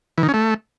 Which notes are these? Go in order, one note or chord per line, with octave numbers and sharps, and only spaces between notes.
E3
D#3
C#4
A3